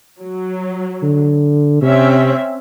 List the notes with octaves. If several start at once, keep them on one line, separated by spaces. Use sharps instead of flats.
F#3
D3
C3 C4 C#4 E5